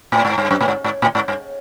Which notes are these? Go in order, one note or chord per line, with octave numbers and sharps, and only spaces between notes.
A2
G#2
G2
F#2
A2
G#2
G#2
A2
G#2
G2